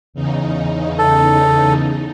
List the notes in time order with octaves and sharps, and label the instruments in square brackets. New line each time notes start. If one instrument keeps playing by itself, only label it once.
[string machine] E2 C#3 D#4
[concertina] A4